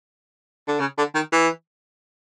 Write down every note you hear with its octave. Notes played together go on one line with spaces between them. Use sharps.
D3
C#3
D3
D#3
E3